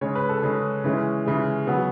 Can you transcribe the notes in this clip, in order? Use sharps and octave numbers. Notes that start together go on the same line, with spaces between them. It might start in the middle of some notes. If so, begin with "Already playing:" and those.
C#3 G#3 C#4 C#5
B4
A4
C#3 G#3 C#4 G#4
C#3 E3 G#3 C#4
C#3 E3 G#3 C#4
C#3 F#3 B3